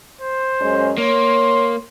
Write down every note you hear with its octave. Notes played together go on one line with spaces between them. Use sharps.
C5
F#2 G#3 C#4
A#3 C#5 C6